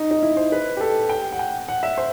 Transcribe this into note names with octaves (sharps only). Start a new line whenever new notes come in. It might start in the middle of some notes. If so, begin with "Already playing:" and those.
Already playing: D#4
D#4
E4
C5
B4
G4
A4
G5
F#5
G5
F#5
E5
C5